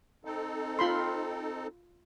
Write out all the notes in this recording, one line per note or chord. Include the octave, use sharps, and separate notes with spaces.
C4 D#4 A4
F4 B5 C6